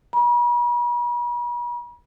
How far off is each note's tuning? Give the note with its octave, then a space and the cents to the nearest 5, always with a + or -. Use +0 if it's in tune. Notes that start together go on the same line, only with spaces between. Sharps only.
B5 -45